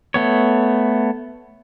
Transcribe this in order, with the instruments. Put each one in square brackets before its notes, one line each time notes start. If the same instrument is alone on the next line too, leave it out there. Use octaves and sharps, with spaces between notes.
[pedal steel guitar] A3 B3 C#5